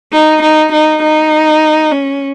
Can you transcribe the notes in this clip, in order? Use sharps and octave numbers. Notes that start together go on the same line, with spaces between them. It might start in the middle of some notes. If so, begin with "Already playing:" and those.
D#4
D#4
D#4
D#4
C#4